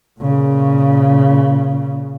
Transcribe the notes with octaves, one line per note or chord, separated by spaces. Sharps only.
A#2 C#3